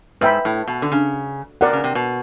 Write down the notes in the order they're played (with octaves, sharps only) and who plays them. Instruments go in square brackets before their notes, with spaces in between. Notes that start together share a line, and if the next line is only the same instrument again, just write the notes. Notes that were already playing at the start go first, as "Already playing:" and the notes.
[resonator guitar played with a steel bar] G#2 [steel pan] B4 E5 G5 B5
[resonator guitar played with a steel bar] A2
B2
D3
C#3
[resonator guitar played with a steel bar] C3 [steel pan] A#4 D5 F#5
[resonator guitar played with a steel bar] C#3
C3
B2